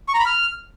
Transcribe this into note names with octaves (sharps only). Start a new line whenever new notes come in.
C#6
A#5
B5
F6